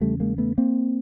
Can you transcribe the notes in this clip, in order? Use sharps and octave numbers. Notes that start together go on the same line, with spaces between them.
E2 C#3 G3 A3
G#3 A#3
A3 B3
A#3 C4